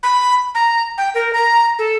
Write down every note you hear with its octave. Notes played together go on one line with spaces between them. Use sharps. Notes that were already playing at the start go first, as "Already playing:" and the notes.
B5
A#5
G5
A#4
A#5
A4